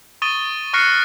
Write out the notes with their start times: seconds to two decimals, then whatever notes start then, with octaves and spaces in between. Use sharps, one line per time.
0.22 C#6 D#6 A6 D#7 G7
0.73 C#6 F6 F#6 A#6 C7 C#7